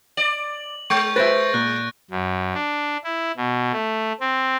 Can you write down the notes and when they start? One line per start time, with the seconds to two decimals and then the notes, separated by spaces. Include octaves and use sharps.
0.17 D5 F#7
0.90 G#3 C#6 G6
1.16 B4 C5 E5 A6 A#6 D7
1.54 A#2 F#6
2.11 F#2
2.54 D4
3.04 E4
3.37 B2
3.73 A3
4.20 C4